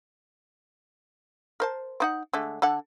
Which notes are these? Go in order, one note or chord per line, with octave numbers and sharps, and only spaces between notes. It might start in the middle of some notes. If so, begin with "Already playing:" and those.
A#4 C5 A5
C4 D#4 F#5
D3 G#3 A3
D3 A4 F#5